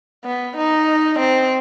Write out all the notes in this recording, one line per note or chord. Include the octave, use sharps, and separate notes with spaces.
B3
D#4
C4